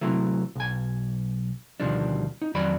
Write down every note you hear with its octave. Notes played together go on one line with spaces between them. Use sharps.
C3 E3 F#3 A3
B1 G#5
D2 B2 D#3 F3 G3 D4
D#4
F2 D#3 F#3 F#4 D5 B5